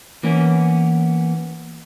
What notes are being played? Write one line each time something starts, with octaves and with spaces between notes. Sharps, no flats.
E3 A#3 B3 C#4